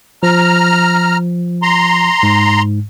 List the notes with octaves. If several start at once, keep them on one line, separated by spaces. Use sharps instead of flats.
F3 A#5 F6
A#5 C6
G#2